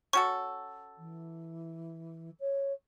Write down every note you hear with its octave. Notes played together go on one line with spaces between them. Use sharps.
C#4 F#4 A4 C#6
E3
C#5